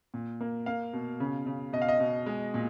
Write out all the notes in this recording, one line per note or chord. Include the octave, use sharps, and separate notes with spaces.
A#2
A#3
A#3 F5
B2
C#3
C#3
B2 D#5
F5
D#5
B2
G#3
A#2